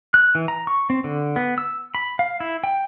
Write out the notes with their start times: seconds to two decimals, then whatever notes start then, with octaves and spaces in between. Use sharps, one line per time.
0.14 F#6
0.35 E3
0.48 A#5
0.67 C#6
0.90 C4
1.04 D3
1.36 B3
1.58 E6
1.95 B5
2.19 F5
2.40 E4
2.64 G5